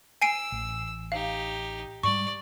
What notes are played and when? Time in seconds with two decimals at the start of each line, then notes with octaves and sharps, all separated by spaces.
0.22 G#5 E6 C7 D7
0.52 A1
1.12 D#4 G4 F5
2.03 G#2 G3 D5 C#6